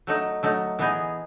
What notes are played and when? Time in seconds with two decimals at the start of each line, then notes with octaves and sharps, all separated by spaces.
0.07 F#3 A3 D#4
0.43 F#3 A3 D#4
0.79 E3 B3 D#4 G#4